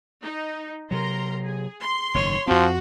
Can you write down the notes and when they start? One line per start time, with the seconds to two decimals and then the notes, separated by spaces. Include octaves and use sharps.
0.22 D#4
0.91 C3 F#3 A#4 A#5 C6
1.43 G#4
1.81 C6
2.14 F#1 G#2 D#3 C#5
2.47 F2 F3 C4 F#4